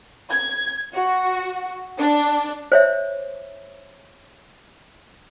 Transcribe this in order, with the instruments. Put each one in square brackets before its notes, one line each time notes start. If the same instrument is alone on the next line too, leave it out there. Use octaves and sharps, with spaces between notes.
[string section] G#6
F#4
D4
[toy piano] C5 C#5 E5